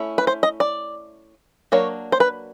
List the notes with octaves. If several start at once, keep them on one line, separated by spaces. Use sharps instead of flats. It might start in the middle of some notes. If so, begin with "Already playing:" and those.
Already playing: A3 C#4 E4
B4
C5
D#5
D5
F#3 A#3 D4 C#5
C5
B4